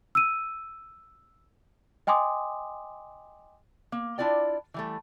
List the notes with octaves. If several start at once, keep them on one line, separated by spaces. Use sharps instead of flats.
E6 D#7
D#5 G5 G#5 C6 D6 D#6
A#3
D4 E4 F4 D5 G5
E3 G3 A3